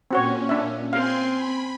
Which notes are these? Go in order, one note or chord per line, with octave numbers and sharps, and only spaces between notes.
A#2 C4 C#4 F#4 C#5
D4 E5
C4 F5 G#5 C6
B5